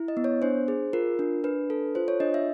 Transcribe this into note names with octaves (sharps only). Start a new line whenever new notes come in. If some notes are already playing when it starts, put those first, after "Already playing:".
Already playing: E4
D#5
B3
C#5
D4 C5
G#4
F4 A#4
D4
D4 B4
A4
F4 C5
C#5
D4 D#5
E5